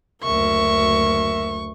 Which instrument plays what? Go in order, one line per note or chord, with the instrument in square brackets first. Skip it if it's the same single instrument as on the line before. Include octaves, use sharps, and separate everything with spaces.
[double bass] F#1 D2 [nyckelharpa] A#4 E5 [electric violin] C#6